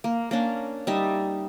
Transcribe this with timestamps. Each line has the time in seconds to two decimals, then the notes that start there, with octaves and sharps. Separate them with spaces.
0.04 A#3
0.31 A#3 C#4 D4
0.87 G3 D#4 E5